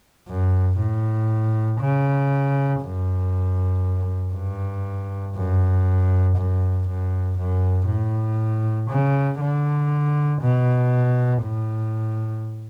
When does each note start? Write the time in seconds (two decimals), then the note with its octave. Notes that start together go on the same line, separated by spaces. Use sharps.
0.28 F#2
0.79 A2
1.81 C#3
2.82 F#2
4.34 G2
5.35 F#2
6.37 F#2
6.88 F#2
7.38 F#2
7.88 A2
8.90 C#3
9.41 D3
10.42 B2
11.44 A2